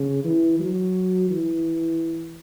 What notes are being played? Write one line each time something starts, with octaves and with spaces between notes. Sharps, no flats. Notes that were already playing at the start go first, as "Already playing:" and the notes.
Already playing: C#3
E3
F#3
E3